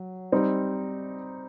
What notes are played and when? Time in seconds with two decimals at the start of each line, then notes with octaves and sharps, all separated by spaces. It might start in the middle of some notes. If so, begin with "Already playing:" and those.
Already playing: F#3
0.32 G3 C4 D#4